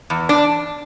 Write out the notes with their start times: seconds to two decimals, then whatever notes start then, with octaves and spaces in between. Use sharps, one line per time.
0.10 E2
0.29 D4